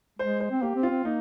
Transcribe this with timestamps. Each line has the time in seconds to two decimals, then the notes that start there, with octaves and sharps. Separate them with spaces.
0.19 G#3 C5
0.40 C5
0.51 C4
0.62 A#3 G4
0.76 C4
0.83 F4
0.90 C4
1.05 A#3 D#4